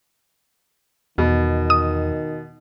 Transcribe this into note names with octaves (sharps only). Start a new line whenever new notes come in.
E2 B2 D#3
D#6